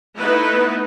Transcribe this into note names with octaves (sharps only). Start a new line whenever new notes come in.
A3 B3 D#4 E4 B4